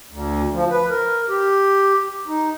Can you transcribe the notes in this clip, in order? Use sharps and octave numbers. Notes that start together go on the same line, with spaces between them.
D2
F3
B4
A#4
G4
D#4